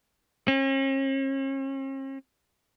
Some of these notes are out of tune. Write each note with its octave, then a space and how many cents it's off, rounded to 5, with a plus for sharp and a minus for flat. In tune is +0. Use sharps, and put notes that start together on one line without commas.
C#4 -45